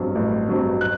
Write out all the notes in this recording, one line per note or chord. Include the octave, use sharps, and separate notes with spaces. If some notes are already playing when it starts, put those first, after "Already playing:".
Already playing: A1 G2 F#3 C4
A1
G2 F#3 C4
F#6